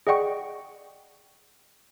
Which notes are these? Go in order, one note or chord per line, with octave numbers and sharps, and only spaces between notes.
G#4 D5 D#5 F#5 G5 C#6